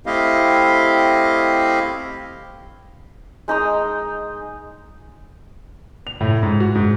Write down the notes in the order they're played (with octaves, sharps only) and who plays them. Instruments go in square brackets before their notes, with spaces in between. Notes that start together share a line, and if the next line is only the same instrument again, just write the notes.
[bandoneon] A3 C4 E4 G4 D#5 F5
[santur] G#3 D#4 A#5 D#6
[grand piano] F7
A2
G#2
F#4
G#2